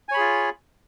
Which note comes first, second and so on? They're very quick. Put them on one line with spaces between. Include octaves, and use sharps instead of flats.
G#5 C#5 B5 G#4 F4